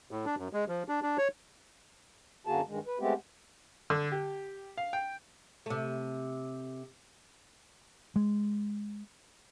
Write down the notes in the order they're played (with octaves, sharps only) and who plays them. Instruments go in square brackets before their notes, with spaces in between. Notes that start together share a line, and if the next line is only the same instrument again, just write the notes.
[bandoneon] A2
D4
F#2
G#3
F3
D4
D4
C#5
[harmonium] F#2 D3 A#3 F#4 G#4 A5
G2 D#3 G#3
B4
G#3 A3 B3 C4 G4
[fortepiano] D3
G4
F5
G5
[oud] C3 A3
[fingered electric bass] G#3